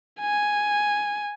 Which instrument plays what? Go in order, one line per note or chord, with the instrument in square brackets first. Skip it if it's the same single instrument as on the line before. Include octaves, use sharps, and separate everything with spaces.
[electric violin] G#5